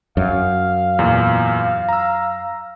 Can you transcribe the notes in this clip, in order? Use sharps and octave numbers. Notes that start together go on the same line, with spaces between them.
F#2 F5
E2 A#2
A#5 E6